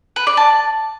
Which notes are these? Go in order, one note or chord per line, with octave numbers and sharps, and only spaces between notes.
B4
D5
A5